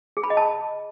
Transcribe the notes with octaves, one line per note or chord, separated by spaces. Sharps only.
G#4
B5
D#5
A5